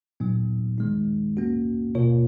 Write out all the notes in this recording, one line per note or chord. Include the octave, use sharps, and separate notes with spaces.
A#2 F#3 B3 D#4
D#3 G#3 D#4
A#3 C#4 F#4
B2 A#3 F4 A#4 C#5